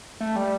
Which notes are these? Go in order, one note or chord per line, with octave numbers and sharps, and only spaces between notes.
A3
G3